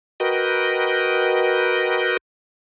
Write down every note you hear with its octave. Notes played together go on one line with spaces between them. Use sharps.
F#4 A#4 B4 D#5 G5